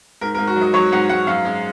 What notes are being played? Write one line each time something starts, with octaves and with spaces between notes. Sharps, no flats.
G#2 A#4
A#4
G#2
F#4
F#3 D#5
F#3 C#5
G#2 F#5
G#2 F#5
F#2 F5
G#3